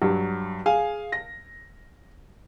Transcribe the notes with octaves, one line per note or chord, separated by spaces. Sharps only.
G2 F#3
G#4 F5 G#5
A#6